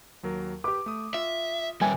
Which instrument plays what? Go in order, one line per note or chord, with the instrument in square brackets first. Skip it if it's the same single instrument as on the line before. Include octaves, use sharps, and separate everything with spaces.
[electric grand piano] D#2 F#3 A#4
[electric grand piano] G4 B4 [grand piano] D6
[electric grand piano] A3 D#6
[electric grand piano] F4 [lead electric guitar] E5
[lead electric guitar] D#2 G3 [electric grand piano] B4 E5 G5 [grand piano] G#5